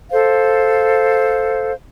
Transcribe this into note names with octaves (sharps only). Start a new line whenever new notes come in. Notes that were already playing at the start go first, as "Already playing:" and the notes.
A4 C5 F5